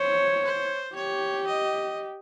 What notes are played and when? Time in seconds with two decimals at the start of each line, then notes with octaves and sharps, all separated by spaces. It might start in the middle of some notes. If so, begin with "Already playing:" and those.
Already playing: C5 C#5
0.45 C5
0.95 G4 C#5
1.47 D#5